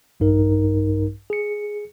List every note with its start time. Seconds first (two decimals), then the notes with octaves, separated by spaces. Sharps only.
0.20 A#1 G2 D#4 A#4
1.30 G#4 C#7